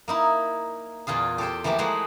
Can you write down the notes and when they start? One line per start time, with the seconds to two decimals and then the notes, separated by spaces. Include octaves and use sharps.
0.08 A#3 D#4 E4
1.07 E2 A#2 F4 G#4
1.38 G4 A4 C5 G5
1.64 E3 F3 A3 A#3 G4
1.78 E3 G#3 A3 D#4 C5 F#5